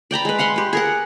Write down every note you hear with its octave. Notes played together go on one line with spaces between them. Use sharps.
D5 G5 A#5 B5
G#3 B4
F5 F#5 B5 C6
G4 B4
G#4 A#4 F#5